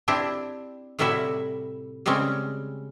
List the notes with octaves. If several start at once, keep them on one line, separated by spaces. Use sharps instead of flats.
C4 D4 E4 G4
A2 C3 G3 E4 F#4 E5
C#3 G3 G#3 C4 C#4